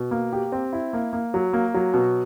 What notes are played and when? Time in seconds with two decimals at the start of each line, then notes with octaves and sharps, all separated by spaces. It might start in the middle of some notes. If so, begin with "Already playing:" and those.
Already playing: B2
0.11 A#3
0.33 G4
0.52 C4
0.73 E4
0.93 A#3
1.13 A#3
1.34 F#3
1.53 A#3
1.74 F#3
1.94 B2